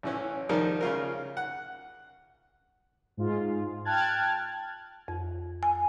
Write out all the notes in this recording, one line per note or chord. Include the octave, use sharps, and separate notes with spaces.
A1 E3 C#4
D#3 F3 G3 D#4 A#4
C#3 F4 A#4
F#5
G#2 F4
G5 A5 F6 F#6 G#6 A6
F2
G#5